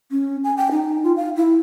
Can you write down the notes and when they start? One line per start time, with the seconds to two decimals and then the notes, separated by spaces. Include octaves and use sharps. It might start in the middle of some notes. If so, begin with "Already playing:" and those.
0.11 C#4
0.44 G#5
0.57 G5
0.72 D#4
1.04 F4
1.16 F5
1.36 E4